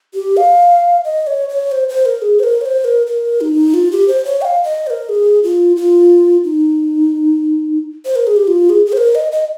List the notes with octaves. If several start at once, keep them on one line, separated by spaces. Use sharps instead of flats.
G4
F5
D#5
C#5
C#5
C5
C5
A#4
G#4
C5
A#4
C#5
C5
A#4
A#4
D#4
F4
G4
C5
C#5
G5
F5
D#5
C5
A#4
G#4
F4
F4
D#4
C5
A#4
G#4
G4
F4
G#4
G#4
C5
A#4
D#5
D#5